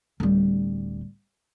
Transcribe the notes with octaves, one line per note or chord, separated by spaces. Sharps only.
D1 G3